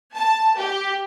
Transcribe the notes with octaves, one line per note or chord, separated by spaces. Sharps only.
A5
G4